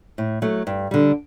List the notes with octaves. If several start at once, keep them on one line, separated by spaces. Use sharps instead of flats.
A2
F#3 A3
G2
D3 G3